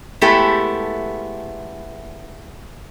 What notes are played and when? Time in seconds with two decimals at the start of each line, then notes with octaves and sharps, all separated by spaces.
0.21 G#3 A3 B3 E4 G4 A4